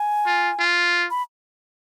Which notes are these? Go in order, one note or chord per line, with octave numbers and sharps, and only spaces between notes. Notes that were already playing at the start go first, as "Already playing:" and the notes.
Already playing: G#5
F4
F4
B5